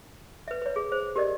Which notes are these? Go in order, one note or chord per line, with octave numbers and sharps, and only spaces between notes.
B4 E5
B4 C#5
G#4
C5
G4 A#4 D5 D#5